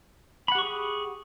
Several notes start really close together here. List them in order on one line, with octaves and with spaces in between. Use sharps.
B5 F#5 G4 C#6 G#4